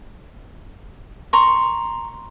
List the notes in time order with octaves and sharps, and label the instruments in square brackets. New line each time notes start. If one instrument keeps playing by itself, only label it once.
[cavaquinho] A#5 C6 C#6